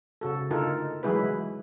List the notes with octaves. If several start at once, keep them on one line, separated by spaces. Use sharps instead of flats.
C#3 F#4 A4
D3 D#4 F4 A4 A#4
E3 F#3 G#3 E4 G#4 B4